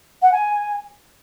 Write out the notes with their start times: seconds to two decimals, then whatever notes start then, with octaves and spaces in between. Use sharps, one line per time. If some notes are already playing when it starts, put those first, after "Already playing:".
0.22 F#5
0.32 G#5